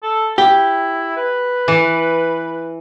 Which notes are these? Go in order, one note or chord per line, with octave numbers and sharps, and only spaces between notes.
A4
E4 G4
B4
E3